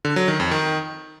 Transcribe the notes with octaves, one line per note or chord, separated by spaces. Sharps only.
D3
F#3
D#3
F2
D#3